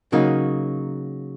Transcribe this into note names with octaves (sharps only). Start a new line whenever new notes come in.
C#3 F#3 A#3 D#4 F#4